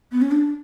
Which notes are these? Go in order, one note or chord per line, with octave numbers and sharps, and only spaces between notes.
B3
C#4
D4